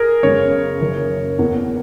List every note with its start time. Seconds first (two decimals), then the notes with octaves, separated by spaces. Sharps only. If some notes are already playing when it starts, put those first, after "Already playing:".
Already playing: G#4 A#4
0.23 F#2 C#3 G#3 B3 C#5
0.81 F#1 F#2 D#3
1.38 E2 B2 A#3